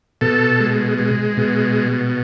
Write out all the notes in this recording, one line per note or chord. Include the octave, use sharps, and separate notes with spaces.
B2 A4
G#3
G#3
B2